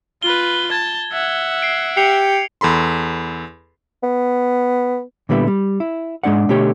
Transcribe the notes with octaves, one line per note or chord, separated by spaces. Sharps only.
F4 B4 G7
A5 G#6
E5 F#5
C7 D7
G4 C7 C#7 F7
E2 A4 B5 C6
B3
A#2 D3 G3 B3 E4
G3
E4
G#2 G#3 D4 D5 F#5
B2 D3 A3 G4 C#5 G5